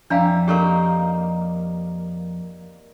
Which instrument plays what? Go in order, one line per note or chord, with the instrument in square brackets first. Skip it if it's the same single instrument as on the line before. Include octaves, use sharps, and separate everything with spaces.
[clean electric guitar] F2 A#5 [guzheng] G3 E4 [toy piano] D4 F5
[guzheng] A#3 D#4 C5 [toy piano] G4 A4 A#4